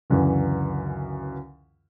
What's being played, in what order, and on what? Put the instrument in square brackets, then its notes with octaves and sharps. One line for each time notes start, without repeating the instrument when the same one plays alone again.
[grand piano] C#2 F#2 D3 E3